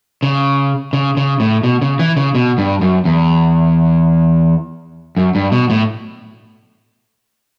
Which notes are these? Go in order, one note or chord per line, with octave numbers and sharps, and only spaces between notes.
C#3
C#3
C#3
A2
B2
C#3
E3
C#3
B2
G2
F#2
E2
F#2
G2
B2
A2